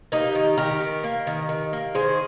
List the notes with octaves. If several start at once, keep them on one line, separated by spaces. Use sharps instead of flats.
A#3 D#4 G4
D#3
D#3 G4 A#4
D#3
A#3
D#3
D#3
A#3
D#3 G#4 C5